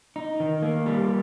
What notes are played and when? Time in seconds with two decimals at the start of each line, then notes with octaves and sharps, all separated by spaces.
0.16 D#4
0.40 D#3
0.62 A#3
0.86 G3